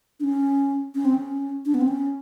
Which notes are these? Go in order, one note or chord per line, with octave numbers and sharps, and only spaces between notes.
D4
C#4
C#4
C4
C#4
D4
B3
C4
C#4